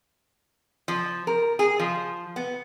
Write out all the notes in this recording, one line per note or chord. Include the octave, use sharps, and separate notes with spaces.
F3
A#4
G#4
F3
B3